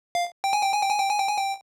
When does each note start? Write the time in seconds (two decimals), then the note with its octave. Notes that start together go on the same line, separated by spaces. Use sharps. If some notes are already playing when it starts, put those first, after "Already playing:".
0.15 F5
0.44 G5
0.53 G#5
0.63 G5
0.72 G#5
0.82 G5
0.90 G#5
1.00 G5
1.09 G#5
1.19 G5
1.28 G#5
1.37 G5